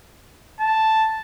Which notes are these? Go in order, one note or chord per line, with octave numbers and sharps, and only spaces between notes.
A5